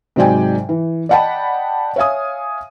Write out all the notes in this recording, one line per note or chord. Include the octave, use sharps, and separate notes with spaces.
G#2 C3 F#3 D5 G5 G#5
E3
D5 D#5 F#5 G5 A5 B5
C#5 E5 F5 G#5 D#6